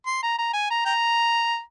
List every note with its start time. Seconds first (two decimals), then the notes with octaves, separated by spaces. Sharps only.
0.06 C6
0.23 A#5
0.38 A#5
0.53 G#5
0.70 A#5
0.85 G5 A#5